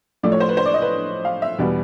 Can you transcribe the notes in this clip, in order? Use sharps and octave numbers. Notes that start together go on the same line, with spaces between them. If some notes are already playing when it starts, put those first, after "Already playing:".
A2 F3 A3 D5
C#5
C5
B4
C5
D5
D#5
B4
F5
E5
E2 B2 G3 B3